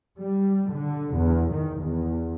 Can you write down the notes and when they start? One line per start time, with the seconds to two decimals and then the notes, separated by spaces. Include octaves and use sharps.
0.18 G3
0.71 D3
1.15 E2
1.52 D#3
1.81 E2